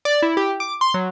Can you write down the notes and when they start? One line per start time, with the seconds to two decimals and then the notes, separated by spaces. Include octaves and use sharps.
0.05 D5
0.22 E4
0.37 G4
0.60 D6
0.81 C6
0.94 F#3